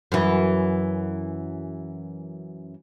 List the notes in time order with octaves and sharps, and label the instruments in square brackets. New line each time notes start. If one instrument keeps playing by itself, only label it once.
[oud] F#2 E3